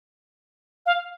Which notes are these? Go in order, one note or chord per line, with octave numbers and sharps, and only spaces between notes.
F5